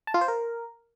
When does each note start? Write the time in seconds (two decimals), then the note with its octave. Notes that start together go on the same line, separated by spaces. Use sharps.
0.07 A5
0.14 F4
0.21 C5
0.28 A#4